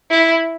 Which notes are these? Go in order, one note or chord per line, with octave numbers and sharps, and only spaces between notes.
E4